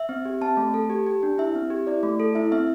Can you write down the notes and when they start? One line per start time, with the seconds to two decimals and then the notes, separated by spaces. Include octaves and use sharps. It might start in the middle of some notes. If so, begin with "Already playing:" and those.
Already playing: E5
0.09 C4
0.25 G4
0.41 C4 A5
0.57 A3
0.74 A4
0.90 G4
1.07 G4
1.23 D4
1.38 E4 E5
1.55 C4
1.70 G4
1.87 E4 D5
2.03 A3
2.20 A4
2.35 E4 E5
2.52 C4 E5